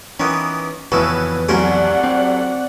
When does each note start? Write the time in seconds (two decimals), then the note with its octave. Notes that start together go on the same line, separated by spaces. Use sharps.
0.20 D#3 E3 B3 C#4
0.92 F1 E2 A2 C#3 F#4 B4 E6
1.49 C2 F#3 A3 C#4 A#4 C5 D5 F#5
2.04 C4